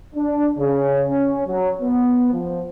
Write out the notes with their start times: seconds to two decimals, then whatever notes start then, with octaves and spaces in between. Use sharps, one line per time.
0.15 D4
0.58 C#3
1.09 C#4
1.46 F#3
1.81 B3
2.32 F3